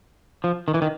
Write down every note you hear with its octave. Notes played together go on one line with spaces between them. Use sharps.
F3
D#3
E3
D#3